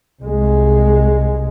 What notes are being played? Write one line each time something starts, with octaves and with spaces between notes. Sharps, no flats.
C2 G#3